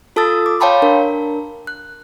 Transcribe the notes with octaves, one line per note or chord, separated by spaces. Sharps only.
F4 A4 A5 D#6 E6 A6
D6
C#5 F5 G5 A5 B5 C6
D4 A#4
F#6